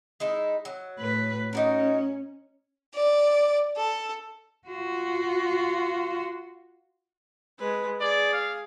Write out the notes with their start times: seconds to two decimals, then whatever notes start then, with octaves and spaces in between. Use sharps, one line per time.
0.20 G#3 D#4 E4
0.65 F#3
0.99 A2 B4
1.53 C#4 D#4 F#4 A#4
2.94 D5
3.76 A4
4.68 F4 F#4
7.59 G#3 B4
8.00 G#4 D5
8.33 F5